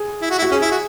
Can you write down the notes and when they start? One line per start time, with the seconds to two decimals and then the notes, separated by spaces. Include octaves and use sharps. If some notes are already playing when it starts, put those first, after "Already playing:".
Already playing: G#4
0.22 E4
0.30 F#4
0.38 E4
0.42 F#4
0.51 C#4 G#4
0.61 E4
0.71 F#4